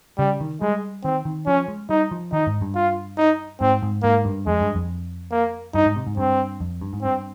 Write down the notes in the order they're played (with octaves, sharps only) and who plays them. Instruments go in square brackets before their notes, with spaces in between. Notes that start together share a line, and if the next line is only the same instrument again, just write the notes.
[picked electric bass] C#3 [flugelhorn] G3
[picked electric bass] D#3
[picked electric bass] G3 [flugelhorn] G#3
[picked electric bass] D#3 [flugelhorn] C4
[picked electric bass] D#3
[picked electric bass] F3 [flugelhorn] C#4
[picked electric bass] G#3
[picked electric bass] G3 [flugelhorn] D#4
[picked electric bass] F3
[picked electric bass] D#3 [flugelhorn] D#4
[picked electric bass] G#2
G2
[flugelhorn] F4
D#4
[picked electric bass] G#2 [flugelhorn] C4
[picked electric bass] G#2
[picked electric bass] G#2 [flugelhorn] A#3
[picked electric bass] G2
[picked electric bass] F2 [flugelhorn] G#3
[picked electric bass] G2
F2
[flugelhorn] A#3
[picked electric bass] G2 [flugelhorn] D#4
[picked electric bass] G#2
C3
G#2
[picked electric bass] G2 [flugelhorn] C4
[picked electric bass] F2
G2
G#2
[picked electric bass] G2 [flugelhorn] C4